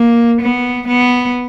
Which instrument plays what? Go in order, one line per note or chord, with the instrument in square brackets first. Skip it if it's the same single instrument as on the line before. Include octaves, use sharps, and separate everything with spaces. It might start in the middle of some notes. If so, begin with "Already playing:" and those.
Already playing: [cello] A#3
B3
B3